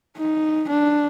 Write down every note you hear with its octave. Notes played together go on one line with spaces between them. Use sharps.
D#4
D4